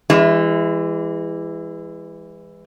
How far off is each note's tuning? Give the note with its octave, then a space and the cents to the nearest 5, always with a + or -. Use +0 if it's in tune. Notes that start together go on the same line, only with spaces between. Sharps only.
E3 +10 G#3 -30